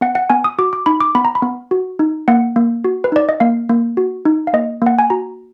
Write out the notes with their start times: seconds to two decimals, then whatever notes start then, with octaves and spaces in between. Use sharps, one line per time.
0.01 B3 F#5
0.15 F#5
0.30 B3 G#5
0.44 D#6
0.59 F#4 D6
0.73 D6
0.86 D#4 B5
1.00 D6
1.15 B3 B5
1.25 A#5
1.35 B5
1.43 B3
1.71 F#4
1.99 D#4
2.28 A#3 F#5
2.56 A#3
2.84 F#4
3.04 B4
3.12 D#4 D5
3.29 D#5
3.40 A#3 F5
3.69 A#3
3.97 F#4
4.25 D#4
4.47 F5
4.53 A#3 D#5
4.82 A#3 F#5
4.99 G#5
5.10 F#4 A#5